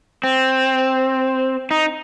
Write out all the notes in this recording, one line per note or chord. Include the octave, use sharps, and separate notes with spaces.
C4
D#4